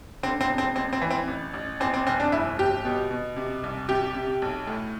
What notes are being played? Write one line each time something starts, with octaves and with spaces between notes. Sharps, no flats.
D3 C4
C4
E1
C4
A1 C4
C4
E3
C4
A1
A1
E2 C4
C4
F1 C4
D4
G1 E4
G1 G4
B2
B2
C3
C2
C3 G4
C3
B1
A2